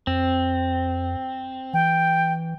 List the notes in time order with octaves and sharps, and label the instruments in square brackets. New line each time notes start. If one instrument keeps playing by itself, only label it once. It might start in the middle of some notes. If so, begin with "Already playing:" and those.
[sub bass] F2 [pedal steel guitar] C4
[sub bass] E3 [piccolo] G5